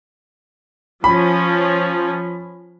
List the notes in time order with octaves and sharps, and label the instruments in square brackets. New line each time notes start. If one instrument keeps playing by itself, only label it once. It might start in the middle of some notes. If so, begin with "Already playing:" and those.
[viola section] F3 C#4 [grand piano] B5